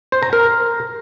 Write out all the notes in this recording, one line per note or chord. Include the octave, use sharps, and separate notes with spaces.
C5
A#5
A#4